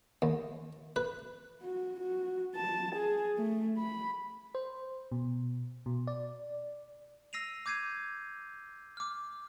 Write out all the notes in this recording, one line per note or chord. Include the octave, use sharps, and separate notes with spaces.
D#2
B4
F#4
F#4
A5
G#4
A3
B5
C5
B2
B2
D5
E6 A#6 C7 D#7 F7
D6 G6 G#6 C7 D#7
D6 F6